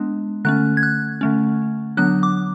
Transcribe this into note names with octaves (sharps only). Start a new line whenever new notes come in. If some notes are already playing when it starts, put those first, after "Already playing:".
Already playing: G#3 B3 D4
D3 A3 C#4 F#6
G#6
F#6
D3 A3 C#4
D3 F#3 B3 D4 F#6
D6